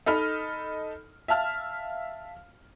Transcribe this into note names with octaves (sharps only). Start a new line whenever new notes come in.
D#4 A4 D#5 B5 F6
E5 F5 A5 F6